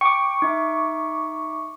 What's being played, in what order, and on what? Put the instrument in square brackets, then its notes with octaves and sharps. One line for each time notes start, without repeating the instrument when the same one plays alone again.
[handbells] G5 [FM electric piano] C#6 D6
[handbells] D#4 E5